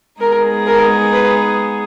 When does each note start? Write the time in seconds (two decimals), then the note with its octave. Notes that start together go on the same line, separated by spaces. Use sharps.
0.21 G#3 B3 D#4 G#4 A#4
0.67 A#4
1.13 B4